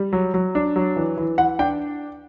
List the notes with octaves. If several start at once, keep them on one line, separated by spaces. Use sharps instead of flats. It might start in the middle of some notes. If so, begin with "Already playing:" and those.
Already playing: G3
F#3
F#3
D4
F#3
E3
E3
E3 F#5
D4 G5